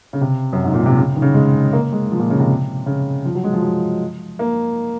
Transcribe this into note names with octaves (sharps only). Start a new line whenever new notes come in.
C#3
C3
F#2
G#2
A#2
C3
C#3
D#3
C#3
G#3
A#3
G#3
F3
A#2
C#3
C3
C#3
F3
F#3
G#3
F3
F#3
A#3